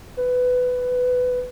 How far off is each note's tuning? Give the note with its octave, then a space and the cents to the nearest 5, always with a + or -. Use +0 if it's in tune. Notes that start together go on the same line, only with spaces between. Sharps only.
B4 +15